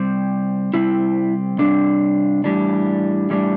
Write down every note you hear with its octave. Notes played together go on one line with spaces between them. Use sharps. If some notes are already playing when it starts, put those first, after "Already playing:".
Already playing: C3 G3 C4
C3 G3 C4 E4
C3 G3 C4 D4
A2 E3 G3 D4
A2 E3 G3 D4